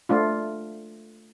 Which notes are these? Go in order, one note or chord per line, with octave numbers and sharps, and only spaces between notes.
A3 D4 F4